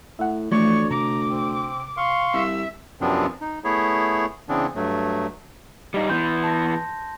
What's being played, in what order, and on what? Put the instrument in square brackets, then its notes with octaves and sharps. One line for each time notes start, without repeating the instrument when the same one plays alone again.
[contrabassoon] A2 [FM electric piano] E5 F#5
[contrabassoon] D2 [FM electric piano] E3 F3 A3 [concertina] C#5 D5 [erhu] C#6
[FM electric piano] C3 [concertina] A#5 [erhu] D6
[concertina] C4
F5 C6 C#6
[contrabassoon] C2 [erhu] E5
[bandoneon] F#2 C3 F3 B3 C4 D4
D#4
A3 B3 E4 G#4 C#5
C#3 E3 B3 C4 D4
G2 F#3 A3
[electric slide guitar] G3 D#4
[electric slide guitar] E3 B3 [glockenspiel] C6 G6
[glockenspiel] A5 A#6